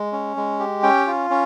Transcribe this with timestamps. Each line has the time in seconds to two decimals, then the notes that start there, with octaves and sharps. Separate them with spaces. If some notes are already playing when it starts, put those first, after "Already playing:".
Already playing: G#3
0.12 C#4
0.37 G#3
0.60 G4
0.83 C#4 G5
1.07 F4
1.30 C#4